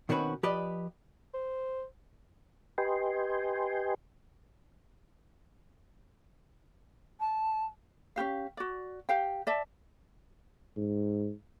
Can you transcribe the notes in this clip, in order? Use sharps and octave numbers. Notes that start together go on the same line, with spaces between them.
B2 D#3 C4 C#4 F#4 B4
F3 G4 B4 D5 D#5
C5
G4 B4 D#5 G5 G#5 C6
A5
C#4 F4 G4 F5
F#4 D5
G4 F5 G5
D5 E5 A5
G#2